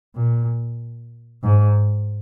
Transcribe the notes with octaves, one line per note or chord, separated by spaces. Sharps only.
A#2
G#2